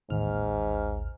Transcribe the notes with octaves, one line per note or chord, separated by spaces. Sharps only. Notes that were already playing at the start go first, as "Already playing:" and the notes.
A1 D#2 G#2 F6